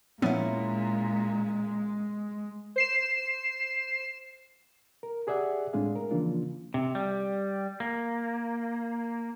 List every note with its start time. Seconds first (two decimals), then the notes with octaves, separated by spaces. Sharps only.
0.22 A#2 F3 G#3 B3 C#4 E4
2.76 C5 C7 E7
5.03 A#4
5.27 G4 G#4 D5 E5 F#5
5.73 A2 G#3 C4 D4 G#4 F5
5.96 A#4
6.11 C#3 E3 F3 A#3 D4 F4
6.74 C3
6.95 G3
7.80 A#3